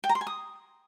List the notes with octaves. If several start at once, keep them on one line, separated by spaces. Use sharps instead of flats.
G5
A#5
C6
G#5
D#6